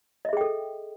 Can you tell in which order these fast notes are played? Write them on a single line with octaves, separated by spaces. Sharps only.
D#5 E5 G#4 G5 A4